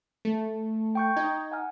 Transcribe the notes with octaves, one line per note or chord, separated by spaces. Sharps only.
A3
G5 C#6 G6
D#4 G#6
F#5 G#5 F6